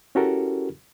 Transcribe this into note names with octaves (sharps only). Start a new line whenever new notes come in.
C#4 E4 F#4 G4 A4 A#4